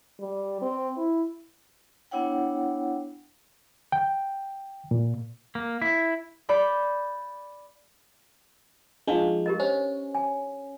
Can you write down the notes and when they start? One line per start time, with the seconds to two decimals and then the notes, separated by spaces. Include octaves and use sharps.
0.20 G3
0.61 C4
0.97 E4
2.11 B3 D4 E4 C#5 F#5 G5
3.92 G5
4.91 A#2
5.55 A#3
5.82 E4
6.49 D5 B5 G6
9.08 F3 G#3 D4 D#4 F5
9.46 G4 A#4 D#5
9.60 C#4 C5
10.15 G#5